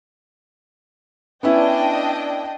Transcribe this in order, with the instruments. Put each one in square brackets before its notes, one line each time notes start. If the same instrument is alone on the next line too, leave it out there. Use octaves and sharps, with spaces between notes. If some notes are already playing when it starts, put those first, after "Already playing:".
[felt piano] B3 C#4 E4 [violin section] D4 D#5 G5